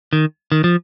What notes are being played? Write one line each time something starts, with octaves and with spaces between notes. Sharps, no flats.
D#3
D#3
F3